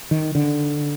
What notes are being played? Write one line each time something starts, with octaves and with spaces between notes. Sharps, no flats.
D#3
D3